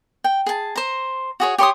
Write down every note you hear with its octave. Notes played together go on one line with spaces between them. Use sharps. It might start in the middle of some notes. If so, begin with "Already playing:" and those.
G5
G#4 A5
C5 A#5
F#4 G#4 C#5
G4 C#5 C6 D#6